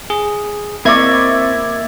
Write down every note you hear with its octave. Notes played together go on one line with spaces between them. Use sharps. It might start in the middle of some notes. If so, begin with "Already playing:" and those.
G#4
A#3 C4 E4 D5 D#5 C#6 G#6